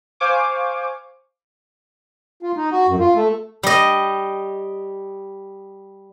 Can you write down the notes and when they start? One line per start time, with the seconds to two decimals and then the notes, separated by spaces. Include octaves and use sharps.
0.20 C5 F5 G#5 C#6 D6
2.42 F4
2.57 D#4
2.71 F#4
2.88 F#2
3.00 F4
3.15 A3
3.63 G3 D#5